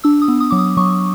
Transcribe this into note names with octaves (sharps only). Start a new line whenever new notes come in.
D4 E6
D#6
B3
D#6
F#3 D6
D#6
F#3 C#6